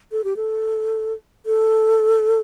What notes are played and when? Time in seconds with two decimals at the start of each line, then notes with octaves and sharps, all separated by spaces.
0.12 A4
0.24 G4
0.36 A4
1.46 A4